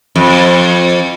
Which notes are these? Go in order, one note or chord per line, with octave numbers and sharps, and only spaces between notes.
F2